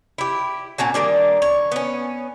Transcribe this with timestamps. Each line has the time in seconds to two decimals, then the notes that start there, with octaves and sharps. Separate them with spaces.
0.18 E4 G4
0.78 A#2 C#4 F#4 A5
0.94 D#3 G3 A#3 D4
1.42 C#5
1.72 B3 C#4